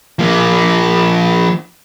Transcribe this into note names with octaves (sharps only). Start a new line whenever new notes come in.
F3 A#3